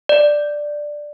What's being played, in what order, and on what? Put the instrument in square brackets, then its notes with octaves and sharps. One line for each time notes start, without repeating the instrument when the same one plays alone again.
[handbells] D5